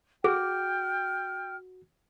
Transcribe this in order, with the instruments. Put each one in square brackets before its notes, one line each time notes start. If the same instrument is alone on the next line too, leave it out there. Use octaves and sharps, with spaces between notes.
[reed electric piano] F#4 [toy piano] G#4 [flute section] G5 F6